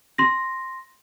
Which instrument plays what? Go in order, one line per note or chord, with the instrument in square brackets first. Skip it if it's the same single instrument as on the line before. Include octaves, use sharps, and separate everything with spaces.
[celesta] C6 A#6